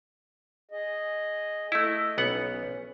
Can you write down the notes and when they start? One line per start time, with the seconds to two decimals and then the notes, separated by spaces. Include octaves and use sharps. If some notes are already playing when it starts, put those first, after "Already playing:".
0.71 G#4 D#5
1.72 A3 E4 D#5
2.18 B1 B3 C#4 F#5